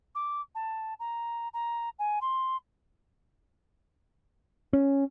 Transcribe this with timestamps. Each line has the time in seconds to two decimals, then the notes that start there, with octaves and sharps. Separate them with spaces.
0.15 D6
0.55 A5
0.99 A#5
1.54 A#5
1.99 G#5
2.21 C6
4.73 C#4